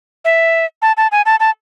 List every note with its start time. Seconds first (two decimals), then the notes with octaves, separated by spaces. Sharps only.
0.25 E5
0.82 A5
0.97 A5
1.12 G#5
1.26 A5
1.40 A5